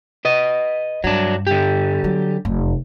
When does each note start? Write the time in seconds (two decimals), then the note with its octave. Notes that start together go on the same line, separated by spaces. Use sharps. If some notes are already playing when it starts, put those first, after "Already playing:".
0.25 B4 D#5
1.04 G2 F#3 D4
1.47 D3 G4
2.04 F#3
2.45 F1 F#2